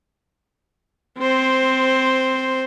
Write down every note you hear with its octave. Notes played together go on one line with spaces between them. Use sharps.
C4 C5